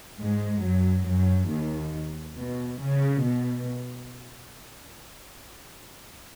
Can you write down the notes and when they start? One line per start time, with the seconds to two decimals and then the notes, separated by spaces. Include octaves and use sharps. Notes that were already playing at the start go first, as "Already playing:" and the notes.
0.20 G#2 G#3
0.63 F#2 F#3
1.06 F#2 F#3
1.49 D#2 D#3
2.35 B2
2.78 C#3
3.22 B2